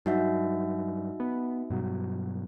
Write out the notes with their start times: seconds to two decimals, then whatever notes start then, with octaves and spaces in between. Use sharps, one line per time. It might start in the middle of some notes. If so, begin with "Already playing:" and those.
0.06 G2 F#3 D#4 F#4 E5
1.20 B3
1.70 G2 B2 F#3